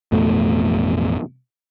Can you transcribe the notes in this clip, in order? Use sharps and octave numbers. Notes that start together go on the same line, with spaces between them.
A1 F2 B2 A3